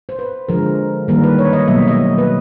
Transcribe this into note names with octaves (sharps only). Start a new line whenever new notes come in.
C5
B4
D3 F3 G#3 A#4
D#3 G3 A#3 A#4
B4
C#5
D#5
B2 F#3 A#3 E5
D#5
B4